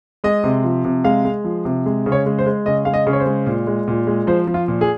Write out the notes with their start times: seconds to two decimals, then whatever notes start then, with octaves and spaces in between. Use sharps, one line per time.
0.24 G#3 D#5
0.44 C3
0.64 F3
0.85 C3
1.04 G#3 F5
1.25 G#3
1.44 F3
1.65 C3
1.86 G#3
2.06 C#3
2.12 C#5
2.26 G#3
2.39 C5
2.46 G#3
2.66 C#3 D#5
2.85 G#3 F5
2.94 D#5
3.07 C#3
3.13 C#5
3.20 C5
3.26 G#3
3.46 A#2
3.67 G#3
3.88 A#2
4.07 G#3
4.27 F3 C5
4.47 F3
4.54 F4
4.68 A#2
4.81 G#4